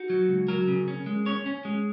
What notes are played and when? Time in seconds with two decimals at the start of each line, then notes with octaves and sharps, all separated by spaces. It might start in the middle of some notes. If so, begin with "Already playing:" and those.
Already playing: D#4 F#4
0.10 F#3
0.28 C#2
0.48 F#3 A#4
0.68 C#3
0.88 C#4
1.06 G#3
1.26 C#4 C#5
1.46 C#4
1.65 G#3